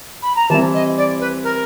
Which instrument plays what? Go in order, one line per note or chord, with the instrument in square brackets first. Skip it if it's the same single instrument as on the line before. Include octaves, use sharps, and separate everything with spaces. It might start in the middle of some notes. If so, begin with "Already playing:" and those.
[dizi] B5
A#5
[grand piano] E3 G3 C4 E4 [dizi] A5
[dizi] D#5
D5
B4
A#4